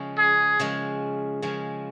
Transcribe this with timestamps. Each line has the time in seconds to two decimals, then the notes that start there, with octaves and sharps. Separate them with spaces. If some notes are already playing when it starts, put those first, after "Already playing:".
Already playing: C#3 F3 G#3
0.18 G#4
0.59 C#3 F3 G#3
1.42 C#3 F3 G#3